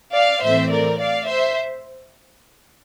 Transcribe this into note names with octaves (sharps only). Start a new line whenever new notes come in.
D5 F5
A2 E3 A3 C4 C5 E5
A#4 D5
D5 F5
C5 E5